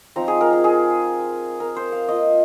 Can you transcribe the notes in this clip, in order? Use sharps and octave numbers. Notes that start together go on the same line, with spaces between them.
F3 C4 D#4 A#5
G#4
A#4
G#4
G#4
A#4
C5
F5
A#3 F4 D#5